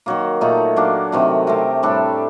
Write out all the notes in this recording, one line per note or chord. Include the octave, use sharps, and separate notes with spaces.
D#3 F#3 A#3
A#2 A3 D#4
F#3 A#3 D4
C3 D#3 F#3 A3
A3 C4 G4 A#4
A2 G3 D4 A4